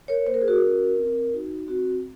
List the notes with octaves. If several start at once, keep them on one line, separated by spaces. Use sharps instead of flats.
A#4 C#5
A#3 C5
A#4
G#4
F#4 A#4
C#4 F#4
C4
D#4 F#4
C4 F#4